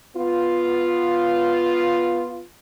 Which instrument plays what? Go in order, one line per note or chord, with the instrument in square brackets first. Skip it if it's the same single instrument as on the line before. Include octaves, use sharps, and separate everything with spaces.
[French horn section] B3 F4